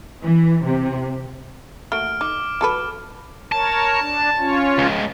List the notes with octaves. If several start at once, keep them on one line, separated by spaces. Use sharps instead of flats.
E3
C3
A3 A#3 F#4 F6 D7
D#4 D6
F#3 A4 B4
A#4 C#5 A5
D4
C#4 F4 C#5
C#2 G#2